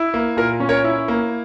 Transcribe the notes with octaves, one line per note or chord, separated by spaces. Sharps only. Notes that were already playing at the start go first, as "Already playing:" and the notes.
Already playing: E4
A#3
A#2 A#4
C#4
A#4 C#5
E4
A#3